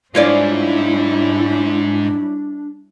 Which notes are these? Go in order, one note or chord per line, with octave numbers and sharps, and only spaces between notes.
G#2 G3 C#4 D4 E4 F4 C#5 D5